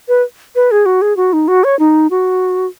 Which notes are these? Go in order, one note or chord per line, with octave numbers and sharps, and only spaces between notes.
B4
B4
G#4
F#4
G#4
F#4
D#4
F#4
C#5
D#4
F#4